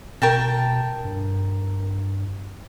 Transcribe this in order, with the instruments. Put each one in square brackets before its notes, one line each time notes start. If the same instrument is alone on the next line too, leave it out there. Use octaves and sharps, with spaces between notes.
[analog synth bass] B2 [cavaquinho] A#4 G5 A5
[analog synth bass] G2